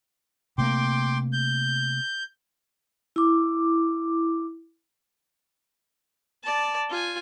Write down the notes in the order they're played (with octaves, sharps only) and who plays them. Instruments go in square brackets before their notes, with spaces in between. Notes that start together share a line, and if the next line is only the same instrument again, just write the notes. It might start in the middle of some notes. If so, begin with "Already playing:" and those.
[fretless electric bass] C3 A3 A#3 [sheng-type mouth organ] G5 C6 D6
[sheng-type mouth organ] G6
[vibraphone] E4 D6
[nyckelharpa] D5 A5
F4 G#5